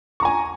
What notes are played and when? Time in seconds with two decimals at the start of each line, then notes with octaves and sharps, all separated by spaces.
0.20 C#6
0.23 A#5
0.25 G#5